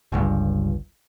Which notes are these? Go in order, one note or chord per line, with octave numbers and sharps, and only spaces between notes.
G1 C#2 G2